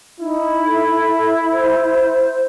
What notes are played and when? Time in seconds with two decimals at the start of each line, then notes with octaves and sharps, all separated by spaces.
0.20 D#4 E4
0.66 A4
1.52 C5